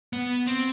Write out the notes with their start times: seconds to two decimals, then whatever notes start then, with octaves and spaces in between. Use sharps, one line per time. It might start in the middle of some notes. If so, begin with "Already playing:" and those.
0.13 B3
0.47 C4